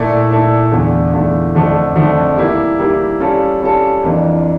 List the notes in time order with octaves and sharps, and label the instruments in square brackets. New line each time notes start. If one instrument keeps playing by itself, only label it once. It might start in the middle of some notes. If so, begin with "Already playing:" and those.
Already playing: [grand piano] A#2 A3 E4 A4 D5
A#2 A3 E4 A4 D5
E2 D3 A3 D4 F4
E2 D3 A3 D4 F4
F2 D3 F3 A3 D4
F2 D3 F3 A3 D4
G3 A#3 E4 G4
G3 A#3 E4 G4
G3 C#4 F4 A4
G3 C#4 F4 A4
F2 E3 A#3 D4 F4